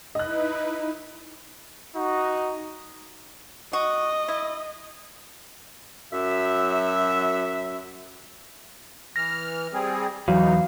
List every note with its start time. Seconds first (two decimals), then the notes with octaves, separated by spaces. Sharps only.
0.15 D#4 E4 B4 D#5 F#6
1.96 D#4 F#4
3.73 F#4 D#5
4.28 E4
6.12 F#2 F#3 E5
9.16 E3 F6 A#6
9.73 G3 C4 G#4
10.28 E2 E3 F#3 D#4 F5